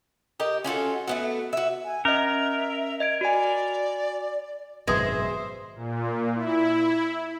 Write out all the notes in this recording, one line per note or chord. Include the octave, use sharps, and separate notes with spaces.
G4 A#4 D#5
C#4 F4 F#4 A4
A3 B3 F#4
F#4 E5
G#5
C#4 A#4 D#5 E5
D#5 G#6 D7
F#4 D5 G#5
G#1 F#2 B2 G#3 B4 C5 E5 D#6
A#2
E4